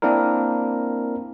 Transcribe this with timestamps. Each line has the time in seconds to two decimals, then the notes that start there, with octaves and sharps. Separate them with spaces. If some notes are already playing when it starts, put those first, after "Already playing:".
0.02 A#3 C4 D4 E4 A#4